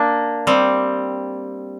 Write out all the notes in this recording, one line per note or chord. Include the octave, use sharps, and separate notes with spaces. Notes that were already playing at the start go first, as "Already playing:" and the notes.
Already playing: A#3 D4
G3 C4